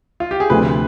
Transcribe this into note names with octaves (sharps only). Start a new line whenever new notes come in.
F4
G4
G#4
D2 C3 F3 C4 B4